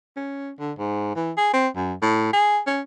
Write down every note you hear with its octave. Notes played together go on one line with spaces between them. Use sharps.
C#4
D3
G#2
E3
G#4
C4
F#2
A2
G#4
C#4